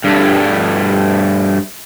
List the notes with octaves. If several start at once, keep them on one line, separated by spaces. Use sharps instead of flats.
G2 A3